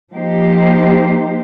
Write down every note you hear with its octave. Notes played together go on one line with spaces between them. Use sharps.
F3 A#3 D#4 G4 C5